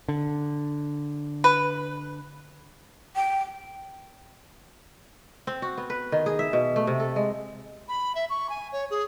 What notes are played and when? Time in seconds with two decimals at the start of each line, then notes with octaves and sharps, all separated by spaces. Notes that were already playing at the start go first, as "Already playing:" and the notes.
0.09 D3
1.44 B4
3.16 G5
5.47 C4
5.62 F#4
5.78 B3
5.90 B4
6.12 D#3
6.26 G#4
6.39 E5
6.53 B2
6.76 A3
6.87 C3
7.00 A4
7.16 G#3
7.89 B5
8.15 E5
8.30 C#6
8.50 G#5
8.72 C#5
8.91 G#4